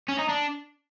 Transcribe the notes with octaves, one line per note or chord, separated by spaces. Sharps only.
C#4
D#4
D4